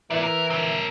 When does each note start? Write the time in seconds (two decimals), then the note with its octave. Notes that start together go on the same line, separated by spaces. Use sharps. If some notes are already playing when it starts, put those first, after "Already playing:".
0.10 E3 A#4 D5 E5
0.23 A#4
0.50 C4 A#4